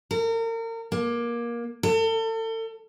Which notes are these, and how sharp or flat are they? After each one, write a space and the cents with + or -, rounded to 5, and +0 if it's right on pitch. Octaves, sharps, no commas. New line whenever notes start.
A#4 -35
A#3 +20
A4 +35